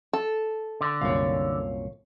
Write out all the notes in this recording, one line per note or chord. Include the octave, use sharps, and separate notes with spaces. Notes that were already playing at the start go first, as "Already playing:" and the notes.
A4
D3
C2 F#2 A#2 C#5 F5